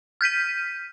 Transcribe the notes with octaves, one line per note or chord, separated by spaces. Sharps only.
F6 G6 B6 D#7